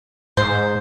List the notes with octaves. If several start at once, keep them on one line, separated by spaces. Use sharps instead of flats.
G#2 C5